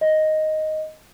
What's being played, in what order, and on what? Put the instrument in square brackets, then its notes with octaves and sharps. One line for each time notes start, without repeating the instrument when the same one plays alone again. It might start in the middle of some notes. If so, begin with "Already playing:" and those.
[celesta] D#5